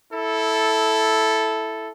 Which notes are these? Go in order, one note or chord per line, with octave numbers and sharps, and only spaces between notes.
E4 A4